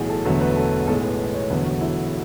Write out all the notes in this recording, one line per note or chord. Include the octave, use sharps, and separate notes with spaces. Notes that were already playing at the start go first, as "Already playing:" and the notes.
Already playing: B1 A2 E3 F#4 G#4
A4
E1 E2 D3 F#3 A3 B4
B4
A4
B1 A2 G#3 A4
B4
B4
C#5
E1 E2 D3 F#3 A3 B4
F#4
E4